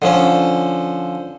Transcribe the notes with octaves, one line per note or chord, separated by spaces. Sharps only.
D3 F3 C#4